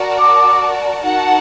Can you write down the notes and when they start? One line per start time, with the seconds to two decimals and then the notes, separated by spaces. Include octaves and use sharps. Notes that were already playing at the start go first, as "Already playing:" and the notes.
Already playing: F#4 A#4 D5 A5
0.19 D6
1.01 D#4 F#4 A#4 F#5 A5